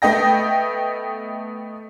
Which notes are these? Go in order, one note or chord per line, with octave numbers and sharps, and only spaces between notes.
A3 B3 D#5 G5 A#6